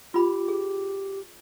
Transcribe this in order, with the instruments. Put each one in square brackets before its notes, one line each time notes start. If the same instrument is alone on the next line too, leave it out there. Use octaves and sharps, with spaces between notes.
[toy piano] F4 B5 [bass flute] G4
[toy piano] G#4